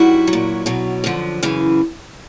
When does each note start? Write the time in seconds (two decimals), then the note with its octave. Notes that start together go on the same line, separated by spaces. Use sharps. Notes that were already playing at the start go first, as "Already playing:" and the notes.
Already playing: F#2 D#3 G3 E4 F#4
0.27 F#3
0.33 A#2
0.66 B2 F#3
1.04 F#2 D3 F3
1.43 F#2 C#3 E3